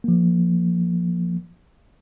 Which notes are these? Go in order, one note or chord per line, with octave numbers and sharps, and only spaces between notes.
F3 A#3